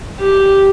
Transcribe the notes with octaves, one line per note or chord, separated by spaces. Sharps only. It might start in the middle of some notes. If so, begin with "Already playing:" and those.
G4